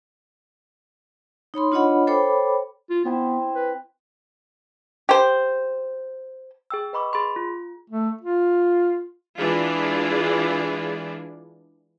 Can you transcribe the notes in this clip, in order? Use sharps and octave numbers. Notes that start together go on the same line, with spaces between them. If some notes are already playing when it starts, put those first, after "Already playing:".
D#4 C#5 B5 C6
D4 F4 C#5 D#5 F#5 B5
A4 C5 C#5 G5 B5 D6
F4
B3 C4 E4 C5
B4
G4 C5
G#4 G5 E6
B4 D#5 B5 C#6 D6
G#4 B5 C6
F4
A3
F4
E3 G#3 D4 F4 G#4 D5